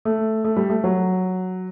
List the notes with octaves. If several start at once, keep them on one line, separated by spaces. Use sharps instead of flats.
A3
A3
G3
A3
F#3